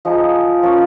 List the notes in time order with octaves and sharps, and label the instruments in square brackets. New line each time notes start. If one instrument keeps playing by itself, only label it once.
[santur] F3 G#3 D#4
F3 A#3 C#4